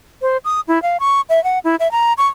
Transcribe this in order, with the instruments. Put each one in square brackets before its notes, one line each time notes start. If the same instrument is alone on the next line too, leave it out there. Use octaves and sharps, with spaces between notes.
[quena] C5
D#6
E4
F5
C#6
E5
F#5
E4
E5
A#5
C#6